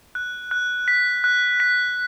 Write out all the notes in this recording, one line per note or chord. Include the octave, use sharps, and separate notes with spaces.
F#6
F#6
B6
F#6
B6